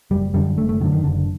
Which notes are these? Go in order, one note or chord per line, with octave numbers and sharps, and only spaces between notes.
F#1 G3
F#2 D3 G3
F#1 A3
A3
F#2 D3 D#3
D#3
F#1 D3